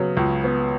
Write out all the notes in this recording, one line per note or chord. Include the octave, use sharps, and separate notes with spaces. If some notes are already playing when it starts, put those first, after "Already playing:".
Already playing: C#3 F#3 B3
C#2
B3